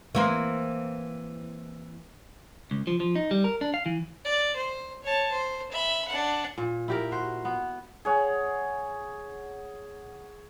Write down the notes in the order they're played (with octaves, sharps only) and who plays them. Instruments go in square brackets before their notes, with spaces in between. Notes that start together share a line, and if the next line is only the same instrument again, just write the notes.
[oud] E3 A#3 C4
[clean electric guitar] C#2
F3
F3
D#4
G3
A#4
D4
F5
E3
[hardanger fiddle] D5
C5
C#5 A5
C5
E5 B5
D4 F#5
[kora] A#2
E4 G4 A#4
F#4 C5
B3
[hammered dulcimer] G#4 C#5 F#5